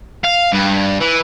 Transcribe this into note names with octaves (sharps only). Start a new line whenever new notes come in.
F5
G2
E3